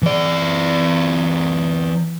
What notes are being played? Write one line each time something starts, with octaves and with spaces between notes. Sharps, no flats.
E3 D5